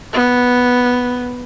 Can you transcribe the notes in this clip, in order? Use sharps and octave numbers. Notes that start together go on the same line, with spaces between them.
B3